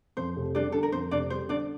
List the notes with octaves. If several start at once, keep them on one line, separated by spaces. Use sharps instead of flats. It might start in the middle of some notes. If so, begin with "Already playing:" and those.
F2 C5
F1
G3 D4 D5
D3 A4
A#4
F2 C5
F1 D4 D5
G3 C5
D3 D4 D5